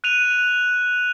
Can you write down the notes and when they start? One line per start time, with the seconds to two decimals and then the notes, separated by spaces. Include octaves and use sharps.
0.04 F#6 D#7 F7